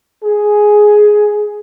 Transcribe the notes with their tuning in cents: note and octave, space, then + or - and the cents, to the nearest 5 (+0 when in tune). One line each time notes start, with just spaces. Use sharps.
G#4 +5